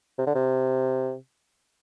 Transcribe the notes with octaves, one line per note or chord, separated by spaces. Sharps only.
C3
D3
C3